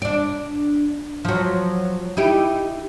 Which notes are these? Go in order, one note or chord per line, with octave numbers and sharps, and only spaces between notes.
D4 D5
F3 F#3
D#4 E4 G4